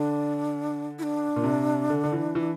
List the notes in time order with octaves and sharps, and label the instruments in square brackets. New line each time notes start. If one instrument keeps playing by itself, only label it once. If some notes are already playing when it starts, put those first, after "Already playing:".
Already playing: [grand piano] D3 [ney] D4
[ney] E4
D4
[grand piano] A#2
C3
D3
D3
E3
E3